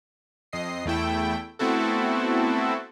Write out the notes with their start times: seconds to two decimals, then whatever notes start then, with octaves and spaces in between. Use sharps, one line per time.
0.53 F2 D#5 C7
0.86 E2 A3 E4 G5
1.59 A3 B3 C4 E4 F#4 A4